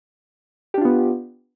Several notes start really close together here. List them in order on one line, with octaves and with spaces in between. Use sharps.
G4 D4 F4 B3